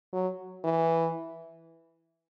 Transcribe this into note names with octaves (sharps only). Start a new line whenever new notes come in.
F#3
E3